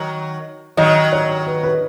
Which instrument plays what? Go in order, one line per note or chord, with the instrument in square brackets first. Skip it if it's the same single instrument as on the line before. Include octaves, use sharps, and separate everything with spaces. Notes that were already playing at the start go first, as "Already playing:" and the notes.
Already playing: [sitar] D#3 F#3
[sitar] D#3 F#3 [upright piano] D#5
[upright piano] C#5
B4
B4